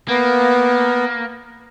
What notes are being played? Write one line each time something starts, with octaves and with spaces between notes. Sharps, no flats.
A#3 B3